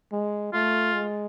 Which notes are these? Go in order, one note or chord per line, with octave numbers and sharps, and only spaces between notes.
G#3
A3 F4
G#3